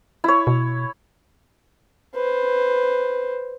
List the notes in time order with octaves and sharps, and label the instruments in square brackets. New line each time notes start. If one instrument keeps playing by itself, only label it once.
[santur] E4 C#5
[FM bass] B2
[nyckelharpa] B4 C5